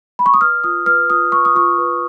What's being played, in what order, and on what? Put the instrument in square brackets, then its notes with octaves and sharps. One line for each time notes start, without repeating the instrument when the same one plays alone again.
[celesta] B5
C#6
D#6
B4 F6
F4 D#6
B4 F6
F4 D#6
B4 C#6
D#6
F4 C#6
B4